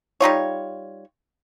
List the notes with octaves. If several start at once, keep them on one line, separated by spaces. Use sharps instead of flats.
G3 D#4 F4 C#5